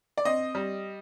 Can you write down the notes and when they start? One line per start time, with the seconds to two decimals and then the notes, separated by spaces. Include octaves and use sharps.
0.17 D5
0.25 C4 D#5
0.55 G3